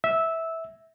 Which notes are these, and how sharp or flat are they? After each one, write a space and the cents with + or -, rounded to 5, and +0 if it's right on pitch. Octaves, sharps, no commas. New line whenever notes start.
E5 -15 E6 -10